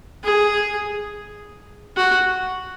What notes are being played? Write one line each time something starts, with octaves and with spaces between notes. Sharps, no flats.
G#4
F#4